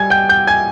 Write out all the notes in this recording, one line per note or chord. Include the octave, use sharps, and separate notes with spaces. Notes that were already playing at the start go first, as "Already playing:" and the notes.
Already playing: G3 G#5 G#6
G5 G6
G5 G6
G#5 G#6